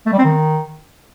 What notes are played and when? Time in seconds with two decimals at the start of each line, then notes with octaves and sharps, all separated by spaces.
0.06 A3
0.12 G3
0.19 C4
0.25 D#3